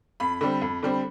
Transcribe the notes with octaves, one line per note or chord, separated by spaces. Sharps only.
F2 B5
D3 G3 C4
F2
D3 G3 C4